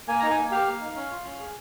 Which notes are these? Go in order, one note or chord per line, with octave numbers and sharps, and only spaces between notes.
A#3 G#5
D#4 A#5
G#5
A#3
G4 F5
A#3
D#4
C#4
F4
C#4
G#4